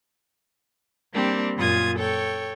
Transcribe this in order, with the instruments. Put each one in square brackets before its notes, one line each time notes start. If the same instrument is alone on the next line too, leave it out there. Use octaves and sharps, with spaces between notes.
[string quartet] G3 A#3 C4 D4 G4
F#2 A#2 F4 D#6 G#6
A4 C#5 G5